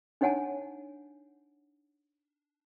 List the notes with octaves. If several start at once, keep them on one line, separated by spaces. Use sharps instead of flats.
D4 D#4 C#5 F#5 G#5 A5